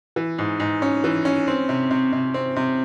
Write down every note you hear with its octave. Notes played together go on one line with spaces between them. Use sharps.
E3
G#2
G#2
C#4
E3
C#4
C4
C3
C3
C3
C4
C3